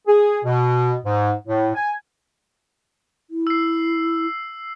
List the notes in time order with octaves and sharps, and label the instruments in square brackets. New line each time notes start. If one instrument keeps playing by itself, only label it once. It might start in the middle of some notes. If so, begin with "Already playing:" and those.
[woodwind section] G#4
B2
G#2
A2
G#5
[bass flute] E4
[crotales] E6 C7